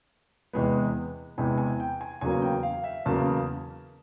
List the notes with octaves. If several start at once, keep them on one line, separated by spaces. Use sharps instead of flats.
E2 C3 E3 G#3 B3
E2 C3 E3 G#3 B3 G#5
G#5
G5
G#5
E2 C#3 F#3 A#3 G#5
G5
F5
E5
E2 C#3 F#3 A#3 A5